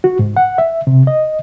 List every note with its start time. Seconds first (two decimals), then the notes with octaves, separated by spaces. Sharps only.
0.04 F#4
0.19 G#2
0.37 F#5
0.58 E5
0.87 C3
1.07 D#5